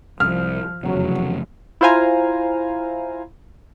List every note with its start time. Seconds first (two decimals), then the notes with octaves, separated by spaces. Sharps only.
0.20 C2 F3 F6
0.84 F1 E2 C#3 F#3
1.81 E4 F4 C5 F5 G#5 A#5